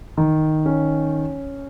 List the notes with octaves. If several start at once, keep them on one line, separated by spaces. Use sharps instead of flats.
D#3
C#4